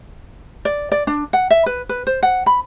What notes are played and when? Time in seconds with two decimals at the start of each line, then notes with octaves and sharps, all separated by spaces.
0.65 D5
0.92 D5
1.07 D4
1.33 F#5
1.50 E5
1.66 B4
1.89 B4
2.07 C5
2.23 F#5
2.46 B5